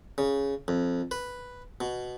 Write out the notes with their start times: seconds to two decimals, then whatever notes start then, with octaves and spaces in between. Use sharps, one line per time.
0.18 C#3
0.68 F2
1.11 B4
1.81 B2